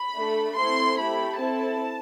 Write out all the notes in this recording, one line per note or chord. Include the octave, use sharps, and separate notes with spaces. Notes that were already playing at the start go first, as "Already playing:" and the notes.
Already playing: B5
A3 D4 A4
A3 C4 E4 A4 C6
A3 E4 G4 B5
C4 E4 A4 A5